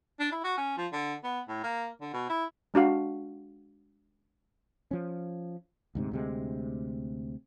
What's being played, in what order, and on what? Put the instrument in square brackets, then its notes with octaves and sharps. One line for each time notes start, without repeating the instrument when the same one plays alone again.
[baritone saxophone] D4
E4
F#4
C#4
F3
D3
B3
A2
A#3
D3
B2
E4
[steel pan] G#3 D4 F#4 F5
[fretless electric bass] F3 C#4
D2 G#2 C3
D2 C3 G#3